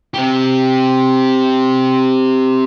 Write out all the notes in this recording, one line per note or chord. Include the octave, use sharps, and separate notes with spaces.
C4 G4